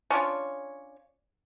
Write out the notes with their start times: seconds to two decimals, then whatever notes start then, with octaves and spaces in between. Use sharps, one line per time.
0.10 C#4 D4 F4 C#5